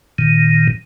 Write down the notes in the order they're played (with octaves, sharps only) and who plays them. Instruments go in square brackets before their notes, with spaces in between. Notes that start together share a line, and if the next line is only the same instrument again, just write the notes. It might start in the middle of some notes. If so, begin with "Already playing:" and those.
[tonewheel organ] A#2 D#3